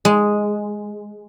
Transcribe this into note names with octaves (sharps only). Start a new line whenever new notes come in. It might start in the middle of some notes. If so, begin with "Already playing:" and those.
G#3